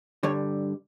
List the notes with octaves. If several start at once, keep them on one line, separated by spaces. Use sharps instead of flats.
G2 D3 G3 C#5